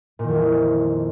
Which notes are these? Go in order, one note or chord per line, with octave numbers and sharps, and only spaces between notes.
F2 A#2 D#3 E3